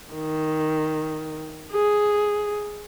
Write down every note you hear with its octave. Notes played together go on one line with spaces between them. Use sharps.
D#3
G#4